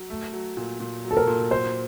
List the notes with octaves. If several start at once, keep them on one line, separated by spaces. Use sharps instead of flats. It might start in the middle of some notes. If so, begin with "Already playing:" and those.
Already playing: F#3
A3
F#3
A#2
A#2
F#3
A4
A#4
A#2
F#3 C5